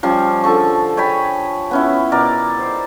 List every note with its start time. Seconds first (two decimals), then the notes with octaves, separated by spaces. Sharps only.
0.03 F3 G3 C#4
0.44 D3 F3 A4 C#6
0.97 C#5 G5 G#5 B5
1.71 B3 C#4 E4
2.12 B2 A#4 D5
2.59 C5